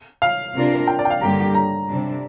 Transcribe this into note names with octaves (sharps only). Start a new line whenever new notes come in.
F5
C3 A#3 D4 F4 A#4
G5
D5
G5
F5
G2 D3 G3 A#3 G4 A#5
A#5
C3 G3 D4